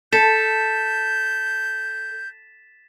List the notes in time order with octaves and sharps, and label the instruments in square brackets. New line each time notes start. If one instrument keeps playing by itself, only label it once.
[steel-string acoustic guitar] A4 [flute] G6 [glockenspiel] A6 B6 E7